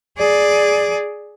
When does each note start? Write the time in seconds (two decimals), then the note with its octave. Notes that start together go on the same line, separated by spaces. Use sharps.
0.18 G#4 D5